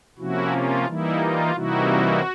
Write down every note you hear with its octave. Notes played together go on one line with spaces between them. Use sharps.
C3 F3 A#3 C#4 E4 F#4
F4
E3 G3 A#3 D#4 E4
F4
C3 E3 G3 A#3 D#4 E4 F#4